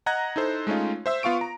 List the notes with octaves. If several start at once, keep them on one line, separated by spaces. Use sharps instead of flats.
D#5 F#5 A#5 F#6 G#6 A#6
D#4 E4 A4 C5
G#3 A3 C#4 D#4 F4
C5 E5 E6
B3 F4 F5 C#6 D7
A#5